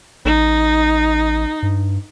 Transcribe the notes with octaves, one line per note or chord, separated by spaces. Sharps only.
A1 D#4
G2